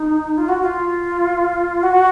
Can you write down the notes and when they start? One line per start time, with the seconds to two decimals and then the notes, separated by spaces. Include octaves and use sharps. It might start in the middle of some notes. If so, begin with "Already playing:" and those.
Already playing: D#4
0.38 F4
0.49 F#4
0.61 F4
1.83 F#4